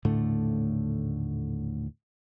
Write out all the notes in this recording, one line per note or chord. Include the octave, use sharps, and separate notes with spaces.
D#1 A2 D3 A3